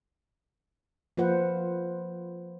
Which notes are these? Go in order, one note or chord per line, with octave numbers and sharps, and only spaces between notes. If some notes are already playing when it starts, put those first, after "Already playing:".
F3 A#3 F4 B4 C5 F#5